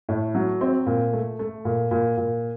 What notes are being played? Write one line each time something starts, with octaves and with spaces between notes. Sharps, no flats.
A2
F#3
C4
A#2
A3
A3
A#2
A#2
A#2